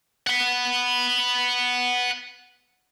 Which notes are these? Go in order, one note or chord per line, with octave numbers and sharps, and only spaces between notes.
F#5 B5